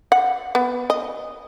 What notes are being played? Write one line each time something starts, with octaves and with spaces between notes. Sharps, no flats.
F#5
B3
D#5